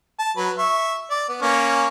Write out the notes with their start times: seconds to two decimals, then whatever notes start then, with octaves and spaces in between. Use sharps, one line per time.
0.19 A5
0.37 F#3 B4
0.58 E5 C#6
1.10 D5
1.29 B3
1.42 A#3 C#4 C#6